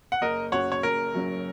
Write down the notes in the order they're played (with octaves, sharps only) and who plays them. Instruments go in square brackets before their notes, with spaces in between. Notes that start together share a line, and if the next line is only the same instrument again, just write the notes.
[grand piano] F#5
[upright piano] F#1 [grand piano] A#4 D#5
[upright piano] F#2 F#3 C#4 [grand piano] C#5 F#5
[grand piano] C#5
[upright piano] F#1 [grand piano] A#4
[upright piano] F#2 F#3 C#4